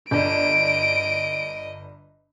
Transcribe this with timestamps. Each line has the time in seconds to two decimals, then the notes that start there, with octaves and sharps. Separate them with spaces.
0.11 G1 D4 D#5 D7